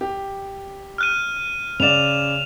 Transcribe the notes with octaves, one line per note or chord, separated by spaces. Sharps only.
G4
F6 F#6 D#7
C#3 D5 E7 F7